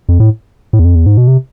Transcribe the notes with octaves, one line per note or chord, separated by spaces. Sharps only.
F2
A2
A2
E2
F2
E2
G#2
B2
C3